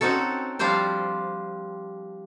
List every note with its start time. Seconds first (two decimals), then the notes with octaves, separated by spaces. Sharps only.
0.01 C4 C#4 D#4 F#4 A4
0.59 F3 G3 D4 F4 G4 C5